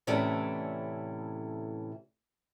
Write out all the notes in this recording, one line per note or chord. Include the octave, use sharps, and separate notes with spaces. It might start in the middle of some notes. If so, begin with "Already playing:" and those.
A2 C3 E3 A3 C#4 D5